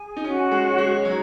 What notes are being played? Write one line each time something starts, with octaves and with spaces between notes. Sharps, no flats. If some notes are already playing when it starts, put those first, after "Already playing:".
Already playing: G#4 G#5
D#4
C#4 F#4
G#3
C#5
G#3
F#3 D#4